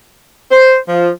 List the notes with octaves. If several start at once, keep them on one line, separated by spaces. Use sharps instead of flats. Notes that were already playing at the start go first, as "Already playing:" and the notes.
C5
F3